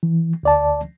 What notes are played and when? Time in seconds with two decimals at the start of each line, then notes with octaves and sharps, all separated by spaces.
0.03 E3
0.43 D2 D5 A5